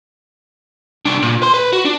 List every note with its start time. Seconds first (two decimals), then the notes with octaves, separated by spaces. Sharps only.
1.05 C2 D4
1.22 A#2
1.42 B4 C6
1.54 B4
1.73 F#4
1.85 D4